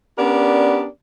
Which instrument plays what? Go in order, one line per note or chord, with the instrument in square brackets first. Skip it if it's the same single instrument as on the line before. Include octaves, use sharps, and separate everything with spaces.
[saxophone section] B3 C#4 D4 G4 A#4 D5